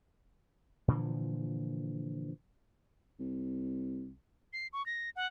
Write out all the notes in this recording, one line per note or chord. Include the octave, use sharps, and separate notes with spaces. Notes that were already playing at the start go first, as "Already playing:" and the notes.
A#2 D3 E3 F3
C2
C7
C#6
A#6
F#5